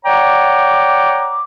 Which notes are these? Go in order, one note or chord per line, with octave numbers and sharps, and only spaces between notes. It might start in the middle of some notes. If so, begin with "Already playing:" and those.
C#5 D5 F#5 G5 A#5 D6